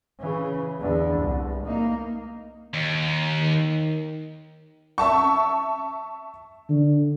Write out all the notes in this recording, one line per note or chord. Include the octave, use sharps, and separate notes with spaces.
C#3 E3
E2 D3
C2
A#3 D#4
D#2
D#3
E5 A5 C#6
D3